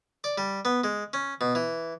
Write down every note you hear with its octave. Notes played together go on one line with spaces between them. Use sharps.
D5
G3
B3
G#3
C#4
B2
E3